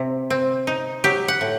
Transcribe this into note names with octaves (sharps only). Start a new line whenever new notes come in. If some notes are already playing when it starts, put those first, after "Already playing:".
Already playing: C3
C4
D#4
F#3 G4
F#5
A2